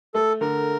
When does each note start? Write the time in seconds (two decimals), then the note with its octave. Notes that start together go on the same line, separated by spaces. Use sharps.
0.14 A3 A4
0.41 D3 A#4